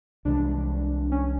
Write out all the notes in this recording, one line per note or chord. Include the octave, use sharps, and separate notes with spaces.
C2 C3 E3 G#3 D4
C#4